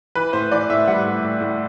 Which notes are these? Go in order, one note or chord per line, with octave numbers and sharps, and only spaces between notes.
E3 B4
A2 C5
E3 D5
A2 E5
G3 F#5
A2
A2
A2